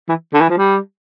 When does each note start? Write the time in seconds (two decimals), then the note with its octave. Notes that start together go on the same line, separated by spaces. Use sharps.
0.09 E3
0.34 D3
0.41 E3
0.50 F3
0.57 G3